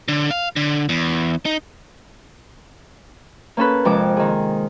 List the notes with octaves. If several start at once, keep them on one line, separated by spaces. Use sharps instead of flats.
D3
F5
D3
E2
D#4
A#3 C#4 A4 B4
F2 C3 G#3 D6
D#3 G#4